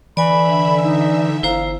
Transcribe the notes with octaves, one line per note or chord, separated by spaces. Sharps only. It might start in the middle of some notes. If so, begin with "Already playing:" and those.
D3 E3 D5 E5 G#5 B5
D#4
G1 E4 C5 F5 A#5